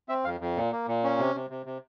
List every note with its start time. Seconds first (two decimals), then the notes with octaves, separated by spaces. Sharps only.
0.09 C4 E5
0.25 F2 F5
0.40 F2
0.56 A#2
0.72 A#3
0.88 A#2
1.04 C#4
1.19 C3
1.35 C3
1.50 C3
1.66 C3